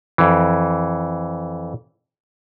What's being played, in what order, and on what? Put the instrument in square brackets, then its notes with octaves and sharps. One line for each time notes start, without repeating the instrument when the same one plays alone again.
[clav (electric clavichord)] F2 E3